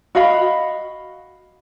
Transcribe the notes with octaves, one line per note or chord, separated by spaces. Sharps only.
F#4 D#5 F5 B5